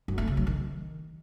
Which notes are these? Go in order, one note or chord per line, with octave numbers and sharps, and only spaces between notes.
F#2
A3
C#3
F#3
D#3